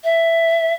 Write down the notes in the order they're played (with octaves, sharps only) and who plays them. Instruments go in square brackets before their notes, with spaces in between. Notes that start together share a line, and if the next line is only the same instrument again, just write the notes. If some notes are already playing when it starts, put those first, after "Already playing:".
[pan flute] E5